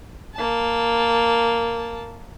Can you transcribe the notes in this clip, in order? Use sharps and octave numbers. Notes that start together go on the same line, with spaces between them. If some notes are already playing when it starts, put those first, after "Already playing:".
A#3 A5